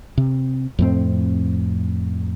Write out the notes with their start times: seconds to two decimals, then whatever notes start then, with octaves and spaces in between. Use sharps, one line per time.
0.18 C3
0.79 F2 A2 C4